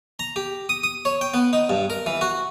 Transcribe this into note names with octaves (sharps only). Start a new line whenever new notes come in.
A#5
G4
D#6
D#6
C#5
G5
B3
D#4
G2
A#4
E3
F#4